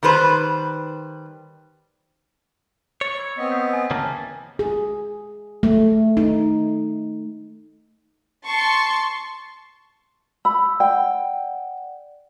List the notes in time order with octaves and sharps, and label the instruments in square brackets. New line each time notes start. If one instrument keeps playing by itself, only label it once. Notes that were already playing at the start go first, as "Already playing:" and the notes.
[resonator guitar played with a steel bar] D#3 G3 B4 C5
[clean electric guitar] C#5 [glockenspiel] A6
[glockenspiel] B5 E6 G#6
[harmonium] B3 C4 D#5 [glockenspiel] E6 B6
[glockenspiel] G6 B6 C7
G#5 A6
[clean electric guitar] C#3 E3 A#3 [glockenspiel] A5 F6 A6
[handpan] G#4
A3
D#4
[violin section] A5 C6 C#6
[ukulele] B5 [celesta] E6
[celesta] D5 F#5 [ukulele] G5